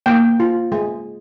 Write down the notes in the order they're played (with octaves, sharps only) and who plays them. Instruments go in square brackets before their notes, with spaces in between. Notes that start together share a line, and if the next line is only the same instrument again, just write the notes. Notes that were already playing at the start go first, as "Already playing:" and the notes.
[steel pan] A#3 G5
F4
G#3